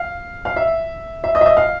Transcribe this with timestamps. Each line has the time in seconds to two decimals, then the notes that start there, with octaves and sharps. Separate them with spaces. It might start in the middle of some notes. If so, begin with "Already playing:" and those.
Already playing: F5
0.45 F5
0.56 E5
1.24 E5
1.35 D#5
1.41 E5
1.46 D#5
1.57 F5